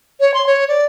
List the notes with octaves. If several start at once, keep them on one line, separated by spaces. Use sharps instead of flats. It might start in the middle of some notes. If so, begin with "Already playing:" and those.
C#5
C6
C#5
D5